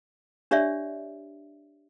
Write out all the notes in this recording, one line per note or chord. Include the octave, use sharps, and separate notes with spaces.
D4 G4 C#5 D5 E5